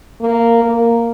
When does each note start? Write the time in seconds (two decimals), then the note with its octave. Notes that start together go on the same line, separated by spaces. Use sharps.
0.21 A#3
0.63 A#3